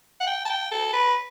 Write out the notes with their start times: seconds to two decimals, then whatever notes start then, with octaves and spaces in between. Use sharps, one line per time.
0.21 F#5
0.27 G5
0.45 A5
0.50 G5
0.71 A4
0.93 B4